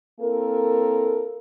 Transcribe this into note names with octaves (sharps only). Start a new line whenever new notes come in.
A#3 C4 E4 A4 A#4